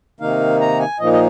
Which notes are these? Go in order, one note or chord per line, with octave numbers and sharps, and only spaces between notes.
C3 D#3 A#3 D#4 F5
A#5
G#5
A#2 F3 A#3 D#4 D#5
D#5